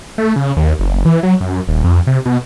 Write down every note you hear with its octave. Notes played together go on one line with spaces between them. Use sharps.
A3
C#3
D#2
F#1
E3
F#3
F#2
D#1
F2
C3
B2